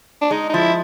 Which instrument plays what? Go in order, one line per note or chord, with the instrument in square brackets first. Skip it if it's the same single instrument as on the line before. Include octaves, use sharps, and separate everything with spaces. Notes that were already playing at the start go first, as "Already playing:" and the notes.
[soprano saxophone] D4
[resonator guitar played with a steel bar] G#3 [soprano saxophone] D#4
[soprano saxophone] D#4
[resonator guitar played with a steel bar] F3 [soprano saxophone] E4